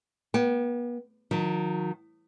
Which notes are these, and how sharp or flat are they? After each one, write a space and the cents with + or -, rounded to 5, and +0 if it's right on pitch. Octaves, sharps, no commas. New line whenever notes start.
B3 -40 G5 -15
D#3 +0 F#3 -40